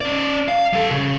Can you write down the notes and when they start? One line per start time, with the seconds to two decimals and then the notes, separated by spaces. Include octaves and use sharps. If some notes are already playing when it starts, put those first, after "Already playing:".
0.01 C#4 D5
0.48 F5
0.73 F#3 A4
0.91 C#3